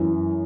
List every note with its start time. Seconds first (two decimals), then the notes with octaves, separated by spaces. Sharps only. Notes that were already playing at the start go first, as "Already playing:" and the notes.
Already playing: F#2 E3